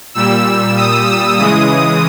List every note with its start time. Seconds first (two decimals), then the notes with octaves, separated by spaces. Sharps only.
0.14 A#2 G3 E6
0.76 D#6
1.07 E6
1.37 C#3 E3 G#3 D#6